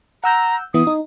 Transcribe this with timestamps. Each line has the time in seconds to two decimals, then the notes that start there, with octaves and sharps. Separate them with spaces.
0.24 F#5 A#5 E6 G6
0.74 E3 B3 E4 D#6
0.87 D#4